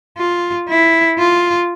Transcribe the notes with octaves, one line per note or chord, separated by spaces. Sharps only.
F4
E4
F4